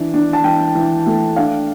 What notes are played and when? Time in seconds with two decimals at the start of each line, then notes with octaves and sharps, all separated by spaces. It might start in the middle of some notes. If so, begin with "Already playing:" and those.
Already playing: E3 D4
0.14 D4
0.33 A5
0.44 E3 G5
0.75 E3
1.06 A3
1.36 D4 F5